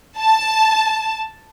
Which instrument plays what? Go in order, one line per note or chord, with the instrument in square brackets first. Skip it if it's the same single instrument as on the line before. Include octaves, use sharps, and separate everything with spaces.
[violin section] A5